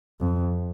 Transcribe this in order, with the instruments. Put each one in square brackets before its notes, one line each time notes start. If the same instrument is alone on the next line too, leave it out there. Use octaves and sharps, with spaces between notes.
[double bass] F2